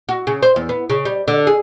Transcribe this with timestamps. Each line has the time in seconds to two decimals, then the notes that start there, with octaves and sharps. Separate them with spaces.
0.09 F#4
0.27 C#3
0.43 C5
0.56 E2
0.69 B3
0.90 C#3
1.05 G3
1.28 D3
1.47 G#4